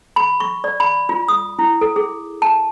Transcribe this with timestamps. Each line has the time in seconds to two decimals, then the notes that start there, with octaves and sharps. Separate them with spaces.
0.16 B5
0.40 C#6
0.64 D5
0.80 B5
1.09 F4
1.28 D#6
1.59 E4
1.81 A4
1.96 G#4
2.42 A5